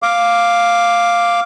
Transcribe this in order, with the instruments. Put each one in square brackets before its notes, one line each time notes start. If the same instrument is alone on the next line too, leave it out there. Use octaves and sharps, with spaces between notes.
[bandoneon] F5 D6